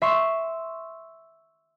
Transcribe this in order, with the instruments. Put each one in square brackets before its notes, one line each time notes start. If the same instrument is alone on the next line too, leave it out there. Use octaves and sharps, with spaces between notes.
[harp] E5 C6 C#6